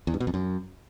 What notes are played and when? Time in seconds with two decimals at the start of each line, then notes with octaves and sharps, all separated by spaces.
0.07 E2
0.14 G2
0.20 B2
0.27 F2
0.34 F#2